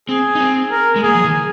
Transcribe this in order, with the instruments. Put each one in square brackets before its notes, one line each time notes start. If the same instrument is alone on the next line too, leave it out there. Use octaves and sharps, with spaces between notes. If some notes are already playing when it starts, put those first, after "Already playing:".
[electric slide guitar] C4 [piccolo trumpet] G#4
[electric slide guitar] D#4
C4
[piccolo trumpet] A#4
[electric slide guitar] G#3
[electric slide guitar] A#3 [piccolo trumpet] G#4
[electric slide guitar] F3
D#3